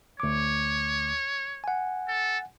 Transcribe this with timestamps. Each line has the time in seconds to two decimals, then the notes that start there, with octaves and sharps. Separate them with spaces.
0.20 D2 C#5 D6
1.64 F#5 G#5
2.08 A4